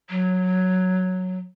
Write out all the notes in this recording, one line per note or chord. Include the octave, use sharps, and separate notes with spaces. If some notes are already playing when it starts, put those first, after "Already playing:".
F#3